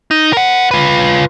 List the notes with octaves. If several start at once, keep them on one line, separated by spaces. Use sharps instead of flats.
D#4
A#4 F#5
F4 B4